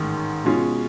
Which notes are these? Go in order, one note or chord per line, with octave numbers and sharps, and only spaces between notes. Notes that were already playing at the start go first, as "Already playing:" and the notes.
Already playing: A1 G#2 D#3
B2 G#3 C#4 F4